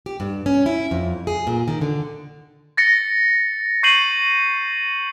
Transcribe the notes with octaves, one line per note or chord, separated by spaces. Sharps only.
G4
G2
C#4
E4
F2
G#4
A#2
D#3
D3
A6 A#6 C#7
C#6 G6 C7 D#7 F#7